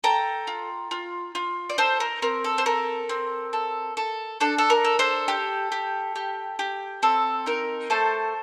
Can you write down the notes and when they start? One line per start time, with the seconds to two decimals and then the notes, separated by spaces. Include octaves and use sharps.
0.04 A4 G5 A#5
0.47 F4
0.91 F4
1.35 F4
1.69 D5
1.78 D#4 A4 C5
2.00 A#4
2.22 C4 A#4
2.44 A4
2.58 C5
2.66 A4 A#4
3.09 C4
3.53 A4
3.97 A4
4.40 D4 A4
4.58 A4
4.70 A#4
4.84 A4
4.99 A4 C5
5.28 G4
5.72 G4
6.16 G4
6.59 G4
7.03 C4 A4
7.46 D#4 A#4
7.90 A3 A4 C5